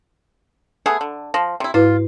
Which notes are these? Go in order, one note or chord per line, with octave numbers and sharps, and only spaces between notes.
A3 B3 G#4
D3
F3 A#6
C3 E4
G#2 E4 F4 B4